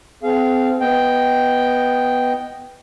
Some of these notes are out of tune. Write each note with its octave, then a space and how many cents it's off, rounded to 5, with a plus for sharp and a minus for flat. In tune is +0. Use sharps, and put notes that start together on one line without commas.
C4 -30 G#4 +40 F5 -15
B3 +0 D#5 +0 G5 +0